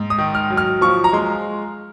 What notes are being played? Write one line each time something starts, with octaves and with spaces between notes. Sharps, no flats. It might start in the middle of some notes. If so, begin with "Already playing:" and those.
Already playing: G#2
D#6
D#3
F6
F#3
F6
F3 C#6
A#5
G#3 C6